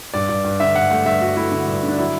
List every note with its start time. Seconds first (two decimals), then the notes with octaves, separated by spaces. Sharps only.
0.14 G2 D5
0.29 G2
0.45 G2
0.60 D3 E5
0.75 G2 F#5
0.90 A3 F#5
1.05 G2 E5
1.22 G2 F#4
1.36 A3 E4
1.52 D3
1.67 G2
1.83 D3
1.88 D4
1.98 F#3 E4